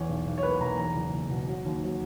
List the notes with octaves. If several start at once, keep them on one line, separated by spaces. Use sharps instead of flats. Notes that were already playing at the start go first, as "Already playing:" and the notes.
Already playing: E2 C#5
B1
B1
C#5
A#3 B4
B1 A#5
E2 A#5
F#1
F#1
B2
F#3
D#2
F#3